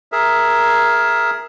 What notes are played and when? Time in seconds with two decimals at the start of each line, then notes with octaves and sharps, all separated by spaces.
0.12 G#4 A#4 E5